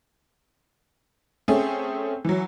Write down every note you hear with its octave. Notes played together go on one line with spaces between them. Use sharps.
A3 C4 C#4 G#4
E3 F#3